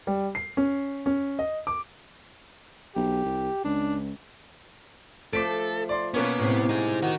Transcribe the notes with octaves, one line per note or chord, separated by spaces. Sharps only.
G3
C7
C#4
C#4
D#5
D6
B1 G4
C2
C#2 D4
F3 A3 A4 D6 B6 D7
D5 C6
B2 A#3 B3 C#4
A2 C3
D#4 G#4
D#3 D#4 F#4